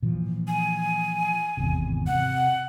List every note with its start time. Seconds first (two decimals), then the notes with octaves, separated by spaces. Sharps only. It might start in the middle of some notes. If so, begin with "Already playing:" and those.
0.03 A#2 E3 F3
0.48 G#5
1.57 G#1 E2 C3
2.07 C3 F#5